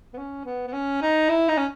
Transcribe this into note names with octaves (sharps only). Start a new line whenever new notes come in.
B3
C#4
B3
B3
C#4
D#4
E4
D#4
C#4